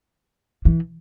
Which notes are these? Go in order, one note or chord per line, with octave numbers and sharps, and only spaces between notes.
E3